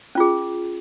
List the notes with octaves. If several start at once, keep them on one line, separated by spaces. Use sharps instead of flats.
C#4 F4 G#4